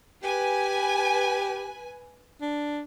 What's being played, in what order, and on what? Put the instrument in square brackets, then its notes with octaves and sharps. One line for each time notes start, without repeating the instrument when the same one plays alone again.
[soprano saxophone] G4 [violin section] B4 G#5
[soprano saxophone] D4